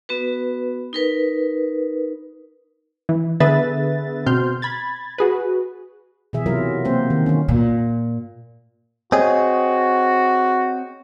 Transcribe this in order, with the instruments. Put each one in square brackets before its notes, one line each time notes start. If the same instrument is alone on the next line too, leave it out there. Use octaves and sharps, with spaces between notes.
[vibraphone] B3 F#4 B4
D#4 A#4 B4
[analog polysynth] E3
D3 B3 G#4 B4 E5 A6
B2 C4 C6 F6 G6
B5 G#6 A6
F#4 G#4 B4
[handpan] B2 E3 G#4 E5
C3 F#3 E4 F4 A#4
A#3 C4 C5
D#3
D#3 C#4
[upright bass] A#2
[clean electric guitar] C4 G#4 [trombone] F#4 [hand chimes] C#5 D#5